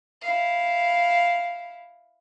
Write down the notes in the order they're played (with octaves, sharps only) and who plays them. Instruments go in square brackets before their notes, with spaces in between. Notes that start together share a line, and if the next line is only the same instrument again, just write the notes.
[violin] E4 F5